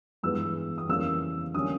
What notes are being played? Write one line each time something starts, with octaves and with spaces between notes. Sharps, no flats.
G2 E3 G#3 B3 E6
D#6
C#3 E3 G3 A#3 E6
D3 G3 A#3 C#4 D#6